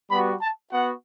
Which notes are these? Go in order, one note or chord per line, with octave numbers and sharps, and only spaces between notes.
G3 B3 F#4 B5
A5
B3 F#4 F#5